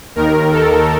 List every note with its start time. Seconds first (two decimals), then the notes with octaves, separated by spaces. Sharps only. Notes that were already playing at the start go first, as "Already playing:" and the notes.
0.15 D#2 D#3 A#4
0.52 A4